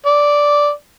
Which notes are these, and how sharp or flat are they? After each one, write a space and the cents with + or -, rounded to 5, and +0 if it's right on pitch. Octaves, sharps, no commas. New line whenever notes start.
D5 -5